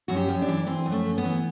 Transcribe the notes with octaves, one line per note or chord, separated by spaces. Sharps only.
F#2 F#4
G4
F#2
D4
E3
E3 C4
F#2
A3
F#2
B3
E3